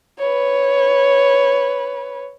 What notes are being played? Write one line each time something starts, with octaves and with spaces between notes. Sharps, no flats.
B4 C#5